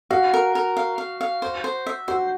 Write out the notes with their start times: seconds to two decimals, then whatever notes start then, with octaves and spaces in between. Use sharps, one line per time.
0.10 F#4 F5
0.34 A#4
0.55 A#4
0.77 F5
0.98 F5
1.21 F5
1.42 C5
1.64 C5
1.87 E5
2.08 F#4 C5